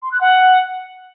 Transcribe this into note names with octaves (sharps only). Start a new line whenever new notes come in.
C6
F#6
F#5